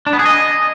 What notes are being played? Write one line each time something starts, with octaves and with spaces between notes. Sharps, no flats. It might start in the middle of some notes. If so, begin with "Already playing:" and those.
D4
B3
G#4
D#5